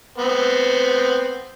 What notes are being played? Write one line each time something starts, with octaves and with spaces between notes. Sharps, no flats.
B3 C4